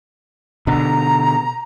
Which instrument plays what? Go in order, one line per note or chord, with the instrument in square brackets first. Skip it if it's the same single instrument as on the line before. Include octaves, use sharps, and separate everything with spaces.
[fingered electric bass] B2 D3 [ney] A#5